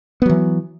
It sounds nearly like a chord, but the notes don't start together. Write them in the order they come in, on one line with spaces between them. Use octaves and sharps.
B3 F#3 E3